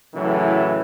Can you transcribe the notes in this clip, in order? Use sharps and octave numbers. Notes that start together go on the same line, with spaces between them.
A2 C#3 E3 F#3